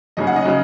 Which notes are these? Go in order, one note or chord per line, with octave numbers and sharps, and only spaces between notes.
F#1 F#2 C#3 D#5
F#5
D#5
C#3 F#3